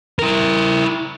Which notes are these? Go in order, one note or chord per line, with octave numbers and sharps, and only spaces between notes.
E4 A#4